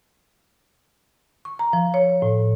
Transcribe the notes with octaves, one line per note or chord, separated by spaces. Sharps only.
C#6
A#5
F3
C#5
A2